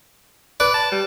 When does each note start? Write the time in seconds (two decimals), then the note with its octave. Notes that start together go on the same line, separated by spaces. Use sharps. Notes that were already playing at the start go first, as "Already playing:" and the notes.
0.60 B4 D5
0.74 A5
0.92 G3